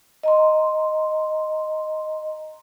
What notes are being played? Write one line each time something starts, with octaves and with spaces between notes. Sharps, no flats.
D#5 A#5 C6